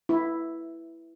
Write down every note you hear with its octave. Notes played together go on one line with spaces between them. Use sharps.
E4